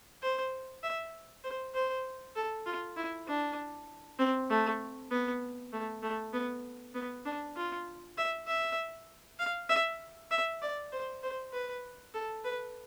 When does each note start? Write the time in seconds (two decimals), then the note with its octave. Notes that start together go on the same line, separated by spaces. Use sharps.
0.22 C5
0.83 E5
1.44 C5
1.74 C5
2.36 A4
2.66 F4
2.97 E4
3.27 D4
4.19 C4
4.50 A3
5.11 B3
5.73 A3
6.02 A3
6.33 B3
6.95 B3
7.25 D4
7.56 F4
8.18 E5
8.47 E5
9.39 F5
9.69 E5
10.31 E5
10.62 D5
10.92 C5
11.23 C5
11.53 B4
12.14 A4
12.44 B4